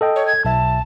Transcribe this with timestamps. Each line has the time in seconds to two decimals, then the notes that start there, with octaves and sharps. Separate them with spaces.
0.01 A4 D#5 G5
0.16 C#5
0.27 G#6
0.45 B1 E5 A5